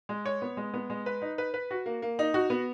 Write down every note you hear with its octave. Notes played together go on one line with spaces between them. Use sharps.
G#3
C#5
B3
G#3
B3
G#3
B4
D#4
B4
B4
F#4
A#3
A#3
D#4
F#4
B3